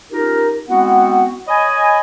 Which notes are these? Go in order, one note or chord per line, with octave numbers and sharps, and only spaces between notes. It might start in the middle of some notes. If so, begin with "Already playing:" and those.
C#4 D#4 F4 G4 A#4
G#3 B3 C4 E4 F#4 F#5
C#5 D#5 G#5 B5